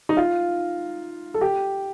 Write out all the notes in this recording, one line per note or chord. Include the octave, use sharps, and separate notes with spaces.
D#4
F4
A4
G4